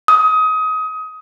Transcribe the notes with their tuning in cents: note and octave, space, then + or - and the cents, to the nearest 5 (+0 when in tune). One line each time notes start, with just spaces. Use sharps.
D#6 +25